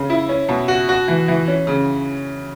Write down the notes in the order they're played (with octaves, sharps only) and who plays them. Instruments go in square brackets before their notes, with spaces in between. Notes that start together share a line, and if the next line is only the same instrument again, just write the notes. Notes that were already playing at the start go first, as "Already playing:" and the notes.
Already playing: [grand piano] C#3 C#4
E4
C#4
B2
F#4
F#4
E3
E3
C#4
C#3